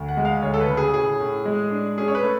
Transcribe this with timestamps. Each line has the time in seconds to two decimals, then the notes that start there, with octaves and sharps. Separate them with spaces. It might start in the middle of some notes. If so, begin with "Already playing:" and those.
Already playing: D2
0.08 F#5
0.17 G#3
0.25 F5
0.43 D2 C#5
0.54 A4
0.61 B4
0.68 C#3
0.77 G#4
0.94 A2 G#4
1.20 A2
1.45 G#3
1.71 D4
1.98 C#4 G#4
2.08 C#5
2.15 B4
2.23 A3